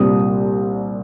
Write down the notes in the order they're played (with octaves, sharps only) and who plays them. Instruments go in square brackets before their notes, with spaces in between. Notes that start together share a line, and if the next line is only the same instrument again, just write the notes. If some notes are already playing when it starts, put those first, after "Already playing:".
Already playing: [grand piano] C2 A#2 G3 C4 D#6